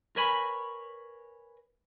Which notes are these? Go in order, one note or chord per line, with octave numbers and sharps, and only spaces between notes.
A#4 B4 C#5 G#5 B5